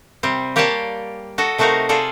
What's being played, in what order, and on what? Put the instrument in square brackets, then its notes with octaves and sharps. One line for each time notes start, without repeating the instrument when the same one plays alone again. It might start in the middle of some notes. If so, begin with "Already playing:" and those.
[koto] C3 G3 C4
A#3 G4 C#5 D5 F5 A5
F#4 A4 D#5
C3 A3 D#4 F#4 A#4 F5
F4 G#4 A4 C5 D5